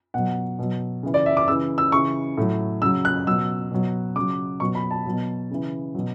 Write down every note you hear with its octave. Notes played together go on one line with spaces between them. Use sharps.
B2 F#3 F#5
B2 F#3
C#3 E3
D5
E5
D6
C#3 E3 E6
E6
C#3 E3 C#6
A2 F#3
C#3 F#3 E6
F#6
B2 F#3 E6
B2 F#3
C#3 F#3 D6
B2 F#3 C#6
B5
A5
B2 F#3
C#3 E3
B2 F#3